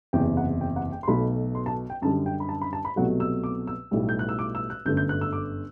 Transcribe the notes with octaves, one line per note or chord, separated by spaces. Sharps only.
F#1 E2 C3 G5
F#5
G5
F#5
G5
C6
B1 B2 F#3 A3 B5
C6
A5
G5
F#2 D3 G3 A5
G5
B5
A5
B5
A5
B5
C2 B2 F#3 A3 F#5
E6
D6
E6
B1 A2 G3
G6
F#6
E6
D6
E6
F#6
G1 F#2 D3 A3 G6
G6
F#6
E6
D6